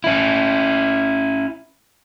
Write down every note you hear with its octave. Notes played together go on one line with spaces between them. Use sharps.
C#4 E4